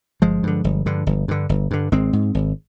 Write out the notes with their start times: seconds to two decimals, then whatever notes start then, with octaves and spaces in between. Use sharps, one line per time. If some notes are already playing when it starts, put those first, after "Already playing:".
0.22 G1 F3 G#3
0.43 G2 D3
0.64 G1
0.86 G2 D3
1.07 G1
1.28 G2 D3
1.49 G1
1.71 G2 D3
1.92 G#1 G#3 C4
2.13 G#2
2.35 G#1